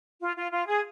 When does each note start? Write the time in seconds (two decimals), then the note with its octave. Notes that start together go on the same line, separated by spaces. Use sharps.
0.21 F4
0.36 F4
0.51 F4
0.67 G#4